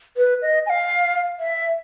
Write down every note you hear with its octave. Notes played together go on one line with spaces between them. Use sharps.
B4
D#5
G#5
F5
E5